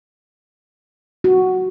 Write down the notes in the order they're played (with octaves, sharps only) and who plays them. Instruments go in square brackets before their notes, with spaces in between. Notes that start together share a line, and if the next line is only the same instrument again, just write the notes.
[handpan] F#4